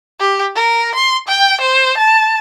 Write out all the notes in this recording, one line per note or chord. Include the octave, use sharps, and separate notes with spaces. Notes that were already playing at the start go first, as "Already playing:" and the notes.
G4
A#4
C6
G5
C5
A5